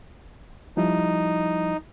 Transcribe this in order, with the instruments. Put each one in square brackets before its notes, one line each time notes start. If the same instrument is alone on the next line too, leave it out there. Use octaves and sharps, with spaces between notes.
[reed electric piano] F3 G3 E4 [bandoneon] D#4